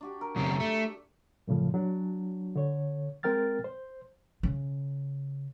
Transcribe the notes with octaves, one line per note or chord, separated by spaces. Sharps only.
D4 F#4 G4
A#4
F#2 C#3 C4 A4 D5
A3
F#2 A2 C#3 F3
F#3 D4 F#4
D3 C#5
G#3 C4 A#4 G5 F6 A6
C5
C#3